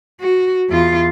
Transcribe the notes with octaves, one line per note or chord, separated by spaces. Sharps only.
F#4
E2 F4